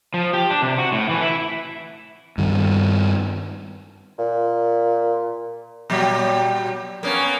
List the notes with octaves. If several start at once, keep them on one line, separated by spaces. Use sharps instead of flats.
F3
G4
D4
C3
F#4
A2
E3
E4
G2 D#3
A#2
A#2 F#3 G3
A#3 B3 C#4